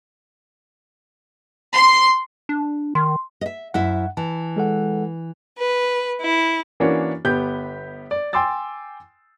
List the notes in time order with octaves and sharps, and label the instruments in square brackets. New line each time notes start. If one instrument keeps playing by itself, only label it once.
[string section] C6
[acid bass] D4
[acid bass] D#3 [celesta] C6
[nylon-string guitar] D#5 E5
[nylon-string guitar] F#2 E4 E5 [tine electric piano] F#5
[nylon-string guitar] E3 [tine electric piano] A5
[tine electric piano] G#3 A4 F#5
[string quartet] B4
E4
[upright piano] E3 A#3 C#4 D4 F#4 C#5
G1 B3 G4 G6
D5
G5 G#5 C6 D6 E6 A6